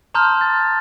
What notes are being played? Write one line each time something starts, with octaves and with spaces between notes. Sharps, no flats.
A5 A#5 C6 D#6 F6 G6
A6